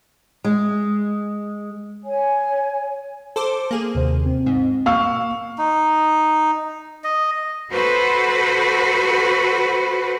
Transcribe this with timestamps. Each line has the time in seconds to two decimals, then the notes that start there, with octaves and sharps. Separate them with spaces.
0.44 G#3
2.04 C#5 G#5
3.36 A4 C5 D6
3.71 A#3 G#4
3.95 D#2 C3 C5
4.26 C4
4.46 G#2
4.86 B2 A#3 F5 C#6 E6
5.58 D#4
7.04 D#5
7.72 F#4 A4 B4 C5